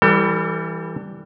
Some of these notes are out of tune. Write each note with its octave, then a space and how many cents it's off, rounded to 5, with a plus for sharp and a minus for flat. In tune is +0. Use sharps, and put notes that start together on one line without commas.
E3 +0 G3 +0 A4 +40